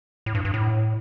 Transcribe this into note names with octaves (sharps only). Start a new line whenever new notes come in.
A2
G2
G2
A2